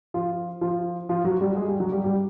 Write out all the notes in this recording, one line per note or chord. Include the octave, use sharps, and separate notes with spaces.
F3 F4
F3 F4
F3 F4
F#3 F#4
G3 G4
G#3 G#4
G3 G4
F#3 F#4
G3 G4
G3 G4